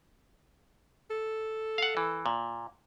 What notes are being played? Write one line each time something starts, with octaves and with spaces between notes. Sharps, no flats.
A4
F5 F#5
E3
A#2